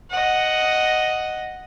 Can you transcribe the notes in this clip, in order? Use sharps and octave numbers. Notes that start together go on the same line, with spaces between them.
D#5 F#5